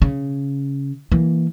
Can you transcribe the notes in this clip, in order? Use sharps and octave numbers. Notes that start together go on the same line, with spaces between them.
C#3
E3 A#3